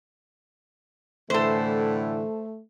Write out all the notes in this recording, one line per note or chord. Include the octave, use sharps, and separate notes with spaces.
A2 D3 E3 A3 A4 C5